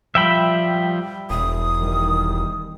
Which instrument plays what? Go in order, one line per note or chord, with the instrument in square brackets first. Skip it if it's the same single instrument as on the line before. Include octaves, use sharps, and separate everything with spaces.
[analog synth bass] F3 [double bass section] G3 [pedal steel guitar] E5 G5 B5
[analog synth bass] E1 [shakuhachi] D#6
[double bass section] D#3 G3